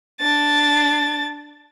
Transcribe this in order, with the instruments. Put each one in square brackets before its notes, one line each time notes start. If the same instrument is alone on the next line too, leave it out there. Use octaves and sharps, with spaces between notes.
[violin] D4 A6